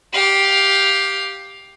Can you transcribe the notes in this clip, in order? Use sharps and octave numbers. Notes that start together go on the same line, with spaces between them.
G4 F5